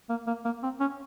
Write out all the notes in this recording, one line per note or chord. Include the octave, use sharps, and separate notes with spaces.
A#3
A#3
A#3
C4
C#4